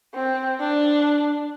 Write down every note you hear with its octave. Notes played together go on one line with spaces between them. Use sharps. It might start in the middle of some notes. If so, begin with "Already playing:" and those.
C4
D4